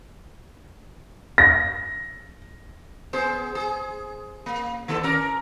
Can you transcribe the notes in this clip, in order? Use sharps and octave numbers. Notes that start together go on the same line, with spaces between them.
A#6
B3 G#4 C5
G#4
A#3
D#3 B3 A4
C#4 A#4